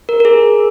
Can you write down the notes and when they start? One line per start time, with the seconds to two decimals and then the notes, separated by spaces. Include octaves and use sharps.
0.09 A#4
0.20 A#4
0.25 G#4